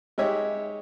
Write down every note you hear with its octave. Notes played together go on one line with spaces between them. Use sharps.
G#3 D#4 G4 C#5 E5